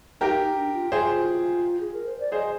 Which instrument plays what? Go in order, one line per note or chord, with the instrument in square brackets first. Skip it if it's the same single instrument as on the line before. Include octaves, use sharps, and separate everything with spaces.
[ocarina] D#4 [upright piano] G4 A#4
[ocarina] D#4
D4
F4
[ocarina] F4 [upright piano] G#4 C5
[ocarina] G#4
A#4
C5
D5
[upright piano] G#4 C5 [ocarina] D#5